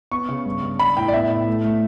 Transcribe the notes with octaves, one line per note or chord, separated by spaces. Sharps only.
B3 C#6
C#3
G2
G2
D4 B5
A2 G5
D5
B3 E5
A2
A3
A3